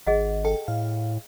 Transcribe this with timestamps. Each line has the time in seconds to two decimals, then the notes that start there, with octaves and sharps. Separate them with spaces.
0.07 G#1 G#4 D#5 F#5
0.45 A4 G5
0.68 A2 F5